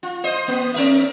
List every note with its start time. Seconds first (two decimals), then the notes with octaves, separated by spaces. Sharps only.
0.03 F4
0.24 C5 D#5
0.48 A#3
0.74 C4 A#4 E5